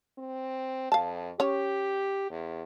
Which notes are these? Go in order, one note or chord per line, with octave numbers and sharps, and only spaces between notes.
C4
F2 F5 A5
C#4 G4 C#5
E2